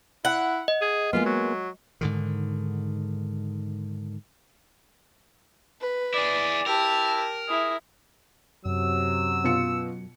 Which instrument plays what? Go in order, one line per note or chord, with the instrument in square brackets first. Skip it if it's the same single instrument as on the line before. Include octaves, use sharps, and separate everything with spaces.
[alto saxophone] E4 [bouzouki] F#5
[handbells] D#5
[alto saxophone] G#4
[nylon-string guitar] G#3 A#3 B3 [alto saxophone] F4
[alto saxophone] F#3
[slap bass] G#2 D3 D#3
[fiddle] B4
[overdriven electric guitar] E4 G#4 [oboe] D5
[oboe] E4 [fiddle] G4 A5 [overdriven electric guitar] A#4
[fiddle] E4 [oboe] G#4
[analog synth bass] F#2 [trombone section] C3 F#3 [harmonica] E6
[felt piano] B2 F4 C#7